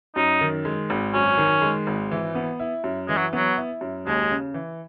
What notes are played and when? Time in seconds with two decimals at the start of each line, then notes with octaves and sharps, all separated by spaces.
0.16 F#2 D#4
0.41 D#3
0.65 G#3
0.90 G#1
1.14 F#2 C#4
1.38 D#3
1.62 G#3
1.87 G#1
2.11 E3
2.35 B3
2.59 E4
2.84 F#2
3.08 E3 G#3
3.18 F#3
3.33 F#3 B3
3.57 E4
3.81 F#2
4.06 D#2 G#3
4.31 C#3
4.54 E3